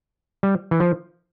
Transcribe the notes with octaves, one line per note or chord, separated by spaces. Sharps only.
G3
E3
F3